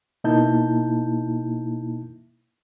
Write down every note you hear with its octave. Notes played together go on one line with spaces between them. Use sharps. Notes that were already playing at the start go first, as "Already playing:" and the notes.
B2 A#3 D#4 E4 A5 G6